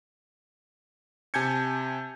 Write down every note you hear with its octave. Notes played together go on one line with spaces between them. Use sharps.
C3 G#5 A5 G6 G#6 C#7